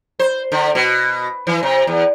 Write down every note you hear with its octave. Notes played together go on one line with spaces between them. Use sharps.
C5
D3
B2
E3
C3
E2